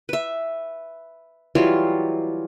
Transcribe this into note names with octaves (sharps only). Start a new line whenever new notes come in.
B4 E5
E3 F#3 G3 F4